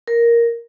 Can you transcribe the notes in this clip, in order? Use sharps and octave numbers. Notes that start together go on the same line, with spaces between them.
A#4